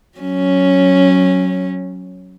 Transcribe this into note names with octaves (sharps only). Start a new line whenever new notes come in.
F#3 C#4